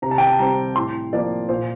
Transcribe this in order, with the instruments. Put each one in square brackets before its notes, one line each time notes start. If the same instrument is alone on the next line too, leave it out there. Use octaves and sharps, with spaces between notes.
[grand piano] C3 A#5
A5
G5
A5
G3 C4 A#5
A2 C6
F3 A#3 D5
A#2 C5